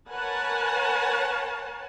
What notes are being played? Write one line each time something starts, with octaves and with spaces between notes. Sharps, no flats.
A#4 B4 C#5 F#5 G#5 A5